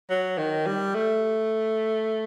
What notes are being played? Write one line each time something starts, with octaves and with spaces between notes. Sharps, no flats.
F#3
D#3
G3
A3